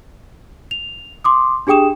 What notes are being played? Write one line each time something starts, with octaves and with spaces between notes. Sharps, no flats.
F7
C6 D6 D#6
D4 G4 G#4 G5 D#6 E7